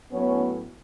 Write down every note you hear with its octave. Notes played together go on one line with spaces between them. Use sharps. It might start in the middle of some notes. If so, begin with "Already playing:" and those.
A2 F#3 B3 C#4